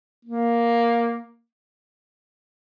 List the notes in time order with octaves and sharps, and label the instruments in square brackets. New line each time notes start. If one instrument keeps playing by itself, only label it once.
[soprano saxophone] A#3